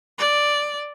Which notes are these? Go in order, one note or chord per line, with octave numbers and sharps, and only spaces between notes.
D5